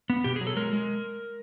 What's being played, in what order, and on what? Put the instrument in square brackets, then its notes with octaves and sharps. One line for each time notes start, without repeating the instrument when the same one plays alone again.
[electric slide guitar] B3
B2 G4
G#4
F#3
A4
G#3 A#4
G#3